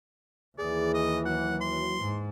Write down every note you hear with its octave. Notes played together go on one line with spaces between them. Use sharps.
D#2 E3 G#4 D5
D#5
F#3 F#5
C6
G#2